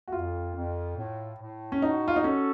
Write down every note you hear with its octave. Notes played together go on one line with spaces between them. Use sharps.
F#4
F2 F4
F2
A2
A2
C#4
D#4 F#4
F4
D#4
C#4 A4